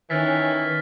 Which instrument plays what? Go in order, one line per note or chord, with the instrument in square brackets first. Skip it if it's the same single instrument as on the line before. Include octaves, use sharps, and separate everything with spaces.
[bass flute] D#3 [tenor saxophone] E3 [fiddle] C#4 [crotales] F6 A6 B6